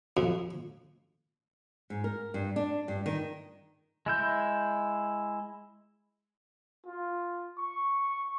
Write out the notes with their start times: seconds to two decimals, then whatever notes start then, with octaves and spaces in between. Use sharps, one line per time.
0.17 F2
1.90 G#2
2.04 A#4
2.34 G2
2.56 D4
2.88 G2
3.06 D#3
4.06 G#3 E4 G6
6.87 F4
7.58 C#6